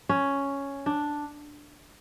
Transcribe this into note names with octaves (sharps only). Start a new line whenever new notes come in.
C#4
D4